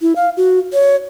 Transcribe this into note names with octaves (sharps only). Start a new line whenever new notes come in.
E4
F5
F#4
C#5